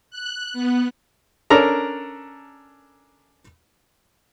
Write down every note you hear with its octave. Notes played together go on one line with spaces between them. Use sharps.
F#6
B3
C#4 D4 A4 A#4 A#5